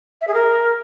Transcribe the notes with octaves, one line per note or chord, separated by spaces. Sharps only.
E5
G#4
A#4